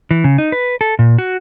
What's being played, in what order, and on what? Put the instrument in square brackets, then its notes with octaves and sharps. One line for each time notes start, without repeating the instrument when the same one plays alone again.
[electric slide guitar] E3
C#3
D#4
B4
A4
A#2
F#4